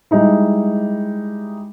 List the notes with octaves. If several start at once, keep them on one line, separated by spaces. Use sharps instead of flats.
G3 G#3 D#4 E4